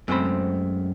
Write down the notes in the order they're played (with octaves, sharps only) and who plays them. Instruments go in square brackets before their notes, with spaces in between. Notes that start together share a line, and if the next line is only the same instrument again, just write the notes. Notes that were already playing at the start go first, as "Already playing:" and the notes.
[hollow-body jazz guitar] F#2 G#3 A3 C4 C5 B5